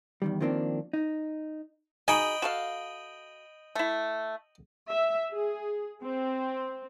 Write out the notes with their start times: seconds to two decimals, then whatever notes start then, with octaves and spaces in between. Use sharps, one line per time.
0.22 E2 D#3 G3
0.40 D#3 F3 A#3 C4 D4
0.93 D#4
2.08 D#4 F#4 G#4 D#5 G5 B5
2.42 F#4 A4 F5
3.75 A3 E4
4.89 E5
5.32 G#4
6.03 C4